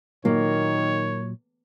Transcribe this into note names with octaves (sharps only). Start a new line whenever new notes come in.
A#2 D#3 F#3 A#3 C#5